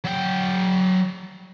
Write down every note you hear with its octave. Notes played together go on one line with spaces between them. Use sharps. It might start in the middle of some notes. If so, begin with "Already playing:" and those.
F#3 G5